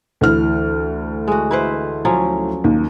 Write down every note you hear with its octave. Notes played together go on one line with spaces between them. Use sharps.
D2 E3 F6
G#3 F#4
E4 B4 C5
F3 F#3 C#4
D#2